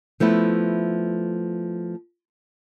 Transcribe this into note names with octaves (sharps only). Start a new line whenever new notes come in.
F3 A3 B3 E4